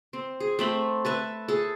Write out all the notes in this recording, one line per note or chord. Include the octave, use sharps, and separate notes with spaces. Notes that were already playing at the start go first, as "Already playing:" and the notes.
C4
G#4
A3 C4 B5
A4 B4 E5
G#4 A4